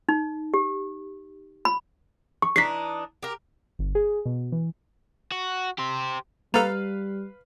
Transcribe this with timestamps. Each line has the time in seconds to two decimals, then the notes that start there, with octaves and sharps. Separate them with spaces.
0.09 D#4
0.54 G4
1.65 B5
2.42 C#6
2.56 E3 D4 D#4 B6 C7
3.23 G4 A#4
3.79 G1
3.95 G#4
4.25 B2
4.52 E3
5.32 F#4
5.78 G4 C5
6.54 G3 A#3 A4 B4 F5 A#5 A6 F7